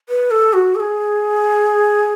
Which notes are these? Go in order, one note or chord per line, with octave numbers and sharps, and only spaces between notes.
B4
A4
F#4
A4
G#4